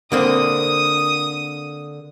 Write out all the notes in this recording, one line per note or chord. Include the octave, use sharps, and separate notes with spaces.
D3 A#3 C4 D#6